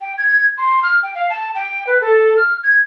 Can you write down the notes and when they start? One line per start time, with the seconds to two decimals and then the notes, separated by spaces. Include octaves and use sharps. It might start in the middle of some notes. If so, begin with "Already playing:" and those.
0.01 G5
0.18 G#6
0.58 C6
0.83 F6
1.03 G5
1.15 F5
1.30 A5
1.55 G5
1.87 B4
2.01 A4
2.37 F6
2.63 G#6